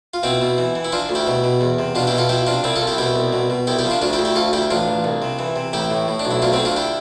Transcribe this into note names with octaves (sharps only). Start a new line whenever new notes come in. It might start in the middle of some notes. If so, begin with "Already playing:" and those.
F4
B2 C4 E4
B2
E3
E3
E4
F3 D4 F4
D2
E4 G4
B2
B2
E2
C3
B2 D4 F4
E4 G4
B2
F4 A4
F3 E4 G4
C3 D4 F4
C2 C4 E4
F4 A4
C2
E4 G4
B2 E4 G4
C2
B2
B2
C2 E4 G4
E4 G4
F3
D4 F4
D2 D4 F4
E4 G4
D2
E4 G4
D2 F4 A4
D2 E4 G4
A1 D4 F4
A1
C2
C3
E3
C3
A1 E4 G4
A2
A2
D4
B1
E4
D2 D4 F4
C4 E4
D3
D4 F4
E4 G4